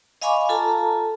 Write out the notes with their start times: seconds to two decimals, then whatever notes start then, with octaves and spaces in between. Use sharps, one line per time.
0.21 D#5 F5 G#5 B5 C#6 D6
0.49 F4 A4 A5 A#5